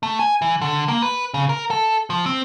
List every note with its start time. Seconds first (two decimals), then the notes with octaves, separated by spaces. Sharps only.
0.03 A3
0.19 G#5
0.42 E3
0.61 D3
0.88 A#3
1.02 B4
1.34 C#3
1.49 A#4
1.71 A4
2.10 F3
2.26 C4